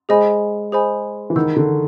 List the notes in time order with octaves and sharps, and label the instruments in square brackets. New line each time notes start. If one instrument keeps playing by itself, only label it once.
[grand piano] G#3 [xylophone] G#4 C5 D#5 G#5 B5
[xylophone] G#4 C5 D#5 G#5 B5
[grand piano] E3
[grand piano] D#3 [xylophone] F#5 B5 E6 G6
[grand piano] D3